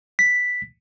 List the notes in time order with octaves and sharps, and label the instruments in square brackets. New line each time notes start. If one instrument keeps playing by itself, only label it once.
[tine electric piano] B6